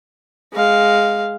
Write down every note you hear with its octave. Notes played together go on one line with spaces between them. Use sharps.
G#3 F5